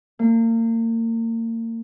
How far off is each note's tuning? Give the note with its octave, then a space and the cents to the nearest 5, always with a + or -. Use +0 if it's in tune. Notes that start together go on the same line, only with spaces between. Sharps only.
A#3 -35